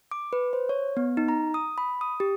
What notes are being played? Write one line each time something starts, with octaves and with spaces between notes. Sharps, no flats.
D6
B4
C5
C#5
B3
D#4
A#5
D#6
B5
D#6
G4